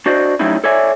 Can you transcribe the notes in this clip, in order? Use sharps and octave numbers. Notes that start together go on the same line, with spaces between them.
D4 F#4 C5 D5 D#5
F#3 G3 A3 C#4 D#4 E4
A4 C#5 D5 E5 G#5